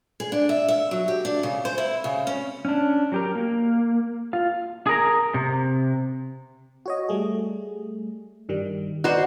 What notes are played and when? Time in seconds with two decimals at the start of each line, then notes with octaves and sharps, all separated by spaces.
0.20 G#4
0.32 D4
0.49 E5
0.68 E5
0.91 F#3
1.08 G4
1.25 D4
1.43 C#3
1.65 C5
1.78 E4
2.04 C#3
2.27 C#4
2.65 C#4 D4
3.12 F#3 G4 A#4
3.35 A#3
4.33 F4 F5
4.87 G#4 A#4 A#5
5.34 C3
6.86 F#4 C#5 D#5
7.09 G3 A3 G#4
8.49 G2 D#3 G3
9.04 D#4 F#4 B4 C5 D5